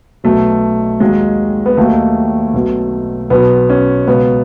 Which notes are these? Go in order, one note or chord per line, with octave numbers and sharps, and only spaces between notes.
B1 B2 F#3 A3
D#2 D#3 F#3 G#3
B3
D#2 D#3 F#3 A3
B1 B2 F#3
B1 B2 F#3 B3
C#4
C#2 B2 F#3 B3